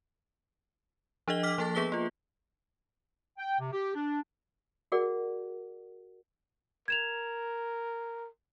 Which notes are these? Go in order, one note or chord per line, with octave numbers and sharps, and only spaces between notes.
F3 D4 G#4 D#5 G7
D6 F6 B6
F3 A#3 A4 A5 A6
B3 G#4 B4 B6 G7
A#3 F4
G5
C3
G4
D4
F#4 G#4 A#4 D5 F#5
A#4 G#6 E7 F7